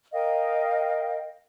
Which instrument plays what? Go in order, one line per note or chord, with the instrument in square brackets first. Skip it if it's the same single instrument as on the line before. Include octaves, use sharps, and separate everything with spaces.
[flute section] A#4 D#5 F5 G5